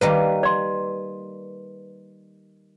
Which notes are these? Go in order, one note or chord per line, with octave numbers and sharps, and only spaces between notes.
D#3 G3 A#3 B4
D5 C6